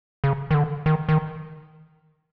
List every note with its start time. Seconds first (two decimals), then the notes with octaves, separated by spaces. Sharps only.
0.24 C#3
0.51 D#3
0.54 D3
0.86 D#3
1.09 D#3